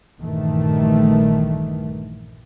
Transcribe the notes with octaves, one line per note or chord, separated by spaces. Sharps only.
A#1 G2 D#3 E3 A3